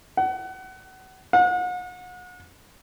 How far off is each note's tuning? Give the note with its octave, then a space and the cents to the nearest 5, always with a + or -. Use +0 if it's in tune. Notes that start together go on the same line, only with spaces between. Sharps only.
F#5 +30
F#5 -35